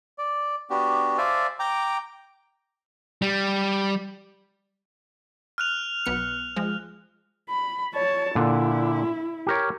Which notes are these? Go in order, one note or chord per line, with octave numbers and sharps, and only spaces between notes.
D5
B3 D4 F#4 G4
C5 D5 E5 F5 G#5 A5
G5 A#5 D6
G3
F6 F#6 F7
B1 B3 C#7
F3 G#3
B5
C#5 A5
A#2 D3 E4
G4 A#4 C#5